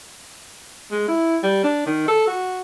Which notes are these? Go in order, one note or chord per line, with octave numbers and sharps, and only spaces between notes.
G#3
E4
G3
D4
D#3
A4
F#4